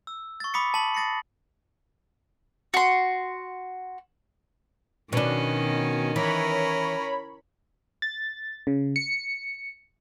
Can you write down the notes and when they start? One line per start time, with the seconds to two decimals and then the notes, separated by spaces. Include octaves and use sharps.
0.07 E6
0.40 C#6 A6
0.54 B5 D6 D#6 B6 C#7
0.74 A5 B5 B6 F#7
0.95 D#6 A6 A#6 C7 C#7
2.74 F#4 C6
5.13 B2 D#3 C#4 D4
6.16 E3 C#4 A#4 C#5 B5
8.02 A6
8.67 C#3
8.96 C#7